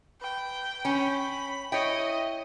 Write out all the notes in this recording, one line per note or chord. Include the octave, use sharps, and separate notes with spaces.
B4 G5
C#4 B5
E4 C#5 D#5 G5